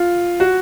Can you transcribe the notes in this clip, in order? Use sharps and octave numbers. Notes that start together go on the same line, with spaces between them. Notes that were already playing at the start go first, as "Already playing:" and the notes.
Already playing: F4
F#4